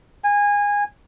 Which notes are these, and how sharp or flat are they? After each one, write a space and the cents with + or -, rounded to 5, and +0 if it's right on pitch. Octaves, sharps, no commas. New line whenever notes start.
G#5 -20